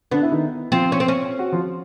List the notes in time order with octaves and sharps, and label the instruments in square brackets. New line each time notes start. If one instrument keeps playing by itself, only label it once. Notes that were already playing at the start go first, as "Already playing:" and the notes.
[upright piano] D3 D4 [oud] B3
[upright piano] E4
D#3 D#4
[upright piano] F3 F4 [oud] C4
[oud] C#4
C4
C#4
[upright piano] F#4
F3 F4